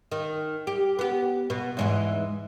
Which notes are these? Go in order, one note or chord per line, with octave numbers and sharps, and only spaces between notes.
D#3
G4
B3 G4
B2 B3
E2 G#2 E3